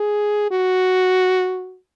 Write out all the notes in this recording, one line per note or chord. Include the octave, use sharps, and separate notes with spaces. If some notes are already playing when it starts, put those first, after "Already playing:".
Already playing: G#4
F#4